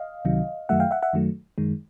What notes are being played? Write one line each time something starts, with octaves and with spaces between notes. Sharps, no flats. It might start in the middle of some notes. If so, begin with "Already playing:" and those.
Already playing: D#5 F5
C#2 C3 D#3 F#3
F#2 D#3 F#3 A3 E5 F#5
F5 G5
E5 F#5
E5 F#5
F#2 D#3 F#3 A3
F#2 D#3 G#3